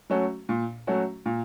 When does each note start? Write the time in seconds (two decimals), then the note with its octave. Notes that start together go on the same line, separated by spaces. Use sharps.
0.10 F#3 A3 C#4 F#4
0.49 A#2
0.87 F#3 A3 C#4 F#4
1.26 A#2